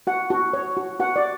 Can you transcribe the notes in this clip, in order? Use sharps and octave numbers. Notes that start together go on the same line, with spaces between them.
F#4 F#5
F#4
C#5
F#4
F#4 F#5
D5